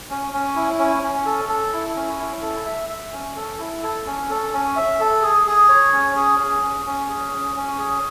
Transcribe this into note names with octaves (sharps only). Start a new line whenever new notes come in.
C#4
C#4
E4
C#4
C#4
A4
A4
E4
C#4
E4
A4
E5
E5
C#4
A4
E4
A4
C#4
A4
C#4
E5
A4
G#4
G#4
C#5
C#4
G#4
G#4
C#4
C#4
G#4
C#4
C#4
G#4